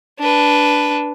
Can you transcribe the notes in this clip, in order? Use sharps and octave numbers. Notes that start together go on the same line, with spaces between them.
D4 B4